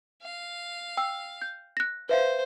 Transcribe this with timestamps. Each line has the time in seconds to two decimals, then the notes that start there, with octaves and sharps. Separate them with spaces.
0.23 F5
0.97 G5 E6
1.42 G6
1.77 F#6 A#6
2.09 B4 C5 E5 F5